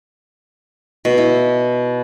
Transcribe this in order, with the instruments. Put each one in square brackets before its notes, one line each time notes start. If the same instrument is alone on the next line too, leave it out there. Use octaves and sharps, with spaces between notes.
[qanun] B2
E4